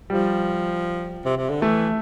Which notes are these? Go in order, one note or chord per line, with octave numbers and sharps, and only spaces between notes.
F3 G3
C3
C3
D3
E3 A3